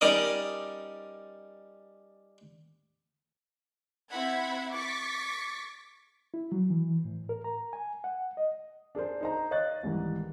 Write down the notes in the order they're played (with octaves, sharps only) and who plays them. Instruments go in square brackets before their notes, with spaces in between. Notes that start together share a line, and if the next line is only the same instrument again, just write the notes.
[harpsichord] G3 C#4 D#4 A#4 D5 D#5
[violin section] C4 E4 E5 F#5 B5 G#6
C#6 D6 A6 B6
[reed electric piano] E4
F#3
E3
A2
A#4
A#5
G#5
F#5
D#5
[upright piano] D4 G#4 A#4 C5
D#4 C5 A#5
C#5 D#5 F5 C#6 F#6 A6
C2 G#2 D#3 E3